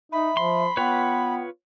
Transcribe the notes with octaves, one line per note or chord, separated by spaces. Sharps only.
D#4 E5 B5
F3 C6
B3 F4 B4 C#5 G5